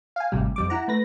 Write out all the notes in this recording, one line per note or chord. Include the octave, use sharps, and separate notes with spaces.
F5 G#5
G#1 A2 C3 G3
F2 G3 D6
E4 F#5 A#5
A3 B4 A#6